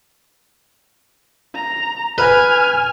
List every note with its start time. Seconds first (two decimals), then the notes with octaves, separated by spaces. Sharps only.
1.54 A#5
2.18 B4 G#5 F6